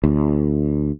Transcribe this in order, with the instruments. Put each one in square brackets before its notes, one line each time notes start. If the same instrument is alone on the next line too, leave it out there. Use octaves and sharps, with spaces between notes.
[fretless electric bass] D2